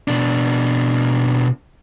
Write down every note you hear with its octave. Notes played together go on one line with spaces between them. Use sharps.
B2 D4